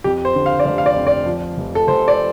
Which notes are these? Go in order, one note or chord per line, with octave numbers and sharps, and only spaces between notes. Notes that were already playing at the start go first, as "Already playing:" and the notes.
F2 G4
C5
D3
F5
D5
F1 F5
F5
D5
F2
D5
F3
F1
A4
F1 C5
D5